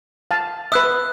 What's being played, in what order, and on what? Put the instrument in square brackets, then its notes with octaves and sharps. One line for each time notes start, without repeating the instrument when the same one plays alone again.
[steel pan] F5 A5
[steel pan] B4 E5 [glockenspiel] D#6 F#6